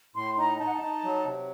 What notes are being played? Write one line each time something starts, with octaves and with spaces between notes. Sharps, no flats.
A2 C6
D#4 A#5
D#4 A5
F#5
A5
D#4
F#3
C3